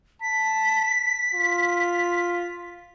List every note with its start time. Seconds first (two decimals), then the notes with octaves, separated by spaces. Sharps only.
0.22 A5 B6
1.34 F4